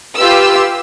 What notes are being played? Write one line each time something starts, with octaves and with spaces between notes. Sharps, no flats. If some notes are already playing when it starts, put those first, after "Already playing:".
F4 G4 B4 E6